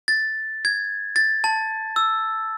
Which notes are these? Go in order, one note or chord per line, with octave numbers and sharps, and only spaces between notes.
A6
G#6
A6
A5
E6